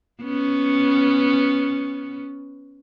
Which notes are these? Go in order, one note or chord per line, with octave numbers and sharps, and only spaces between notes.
B3 C#4